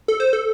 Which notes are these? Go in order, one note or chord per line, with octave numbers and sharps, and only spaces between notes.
A4
C5
A4